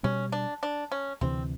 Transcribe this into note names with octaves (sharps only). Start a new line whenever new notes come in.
B2 G3 B3 C#4
D4
D4
C#4
D2 C3 E3 C4